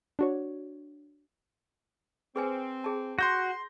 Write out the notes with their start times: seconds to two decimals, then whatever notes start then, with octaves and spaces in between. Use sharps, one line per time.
0.19 D4 F#4 C#5
2.36 C4 G#4 B4 G#5
2.84 G#4 A5
3.19 F#4 C6 G6 A#6